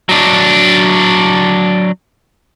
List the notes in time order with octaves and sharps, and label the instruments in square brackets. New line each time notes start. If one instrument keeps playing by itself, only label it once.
[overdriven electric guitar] F#3 D4